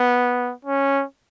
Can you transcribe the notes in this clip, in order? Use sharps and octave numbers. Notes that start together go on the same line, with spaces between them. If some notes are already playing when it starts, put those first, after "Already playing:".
Already playing: B3
C#4